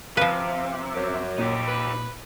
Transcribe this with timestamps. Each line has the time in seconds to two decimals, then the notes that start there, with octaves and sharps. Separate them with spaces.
0.17 C3 F3 B4 F5
0.94 F#2 D6
1.38 A#2 D#4 G4
1.67 B4